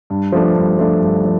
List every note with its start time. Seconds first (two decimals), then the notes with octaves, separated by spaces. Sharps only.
0.10 G2
0.32 F3 A3 D4
0.56 G2
0.79 F3 A3 D4
1.02 G2
1.24 F3